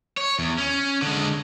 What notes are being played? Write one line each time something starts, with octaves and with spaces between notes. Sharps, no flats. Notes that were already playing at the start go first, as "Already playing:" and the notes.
C#5
E2
C#4
D3 G#3